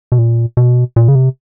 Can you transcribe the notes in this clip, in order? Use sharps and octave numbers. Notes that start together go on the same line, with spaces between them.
B2
A#2
B2
A#2
C#3
C3